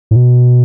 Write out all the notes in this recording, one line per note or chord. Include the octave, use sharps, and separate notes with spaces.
A2
B2